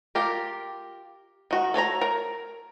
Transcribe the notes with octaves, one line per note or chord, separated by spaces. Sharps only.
F4 G4 A#4
D#3 F#4
A4 C#5 D5 A#5
A#4